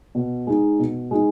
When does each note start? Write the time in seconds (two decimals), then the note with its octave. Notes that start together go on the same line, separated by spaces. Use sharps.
0.15 B2
0.47 G#3 D#4
0.79 B2
1.11 G#3 D#4